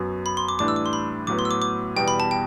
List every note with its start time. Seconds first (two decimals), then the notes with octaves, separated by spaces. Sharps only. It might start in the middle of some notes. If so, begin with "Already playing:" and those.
Already playing: F#2 F#3 B3 F#4
0.26 B5
0.37 C6
0.49 D6
0.59 A2 E3 G3 D4 D6
0.68 E6
0.76 D6
0.86 C6
0.93 B5
1.27 A2 F#3 B3 D6
1.39 C6
1.45 E6
1.51 D6
1.62 D6
1.96 E2 B2 G3 G5
2.08 B5
2.20 A5
2.31 G5